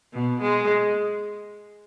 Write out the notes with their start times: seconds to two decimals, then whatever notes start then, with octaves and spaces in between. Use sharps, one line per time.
0.12 B2
0.42 G#3